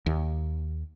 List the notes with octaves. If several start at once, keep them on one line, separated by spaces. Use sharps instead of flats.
D#2